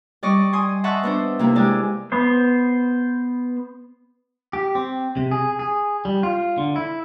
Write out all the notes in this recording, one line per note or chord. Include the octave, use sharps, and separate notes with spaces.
G3 D5 D#5 C#6
G#5 C6 D#6
D#5 E5 F#5 A5 C6 C#6
B3 D4 C5
C3 A#3 E4
G#3 D4 G4 D5 G#5
B3 C5
G4
C4
C3
G#4
G#4
G3
F4
D3
E4